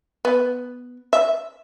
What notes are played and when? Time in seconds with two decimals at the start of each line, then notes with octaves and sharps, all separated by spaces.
0.25 B3
1.13 E5